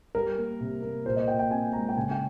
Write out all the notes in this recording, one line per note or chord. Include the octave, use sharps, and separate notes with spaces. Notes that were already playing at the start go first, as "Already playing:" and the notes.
G3 A#4
A#3
C3
A#3
A#2 C5
D#5
A#2 G5
G5
C4 G#5
G#3 A#5
G5
C#3 G#5
G5